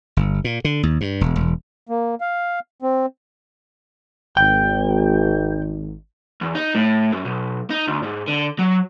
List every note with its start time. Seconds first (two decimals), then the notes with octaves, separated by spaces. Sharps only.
0.17 G1
0.44 A#2
0.65 D3
0.83 D#2
1.01 G2
1.21 E1
1.36 E1
1.89 A#3
2.21 F5
2.82 C4
4.37 G#1 G5
6.42 E2
6.55 D#4
6.75 A2
7.12 F#2
7.25 B1
7.70 D#4
7.88 D2
8.03 G#2
8.28 D3
8.59 F#3